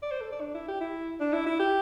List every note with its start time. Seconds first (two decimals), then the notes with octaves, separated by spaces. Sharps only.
0.02 D5
0.11 C5
0.21 A4
0.32 D5
0.41 D4
0.54 E4
0.68 G4
0.80 E4
1.20 D4
1.33 E4
1.46 E4
1.59 G4